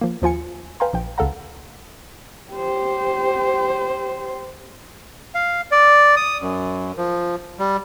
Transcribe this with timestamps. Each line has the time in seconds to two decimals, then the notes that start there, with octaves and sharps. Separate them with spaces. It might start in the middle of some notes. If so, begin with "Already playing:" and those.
0.01 F3 A#3
0.22 D#2 F3 F4 G#5 C#7
0.80 B4 F5 G5 G#5 A#5 C6
0.93 A#1 F3 G5
1.18 C#2 C#3 A4 F5 F#5 A#5
2.52 G4 C5
5.35 F5
5.72 D5
6.17 D#6
6.41 F#2
6.97 F3
7.59 G3